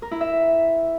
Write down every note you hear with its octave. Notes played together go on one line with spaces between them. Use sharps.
A#4
E4
E5